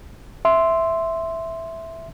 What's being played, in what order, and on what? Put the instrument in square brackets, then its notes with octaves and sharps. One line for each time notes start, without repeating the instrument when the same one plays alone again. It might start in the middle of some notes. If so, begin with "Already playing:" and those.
[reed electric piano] E5 C6